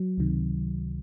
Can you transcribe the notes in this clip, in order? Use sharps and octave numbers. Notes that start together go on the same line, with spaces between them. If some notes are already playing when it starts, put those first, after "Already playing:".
Already playing: F#3
C#2 C3 D#3